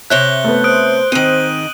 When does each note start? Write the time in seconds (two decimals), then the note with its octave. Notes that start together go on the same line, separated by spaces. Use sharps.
0.10 C3 C#5 E5 F#6 G6 G7
0.44 A3 B3
0.64 C5 D#6 F#6 D7
1.12 G#2 D#3 C4 D#7 F#7